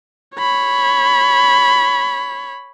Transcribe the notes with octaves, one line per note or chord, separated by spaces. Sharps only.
C#5 B5